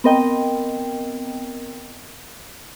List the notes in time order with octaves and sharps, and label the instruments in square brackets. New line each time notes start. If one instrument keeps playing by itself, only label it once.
[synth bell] B3 C4 A#4 D#5 G5